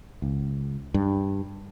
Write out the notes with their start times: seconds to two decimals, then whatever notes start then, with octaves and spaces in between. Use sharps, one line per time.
0.22 C#2
0.94 G2